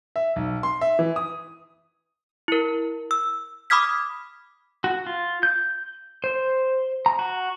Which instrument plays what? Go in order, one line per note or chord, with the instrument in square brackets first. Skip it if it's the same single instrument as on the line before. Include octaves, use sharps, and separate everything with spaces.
[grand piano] E5
B1
C6
E5
E3
D#6
[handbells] E4 A#4
E6
B5 D6 D#6 F6 G#6 B6
[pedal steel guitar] F#4
F4
G6
C5
A#5
F#4